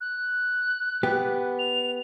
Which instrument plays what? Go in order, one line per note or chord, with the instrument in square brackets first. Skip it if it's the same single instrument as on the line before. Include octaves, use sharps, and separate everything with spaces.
[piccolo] F#6
[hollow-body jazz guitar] B3 G4
[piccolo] F7